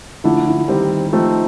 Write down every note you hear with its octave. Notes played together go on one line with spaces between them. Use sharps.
D3 F3 A3 D4 E4
E4
D#3 G3 C4
F3 A3 C4 D#4